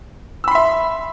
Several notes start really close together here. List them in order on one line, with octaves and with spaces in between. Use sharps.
E6 B5 C6 E5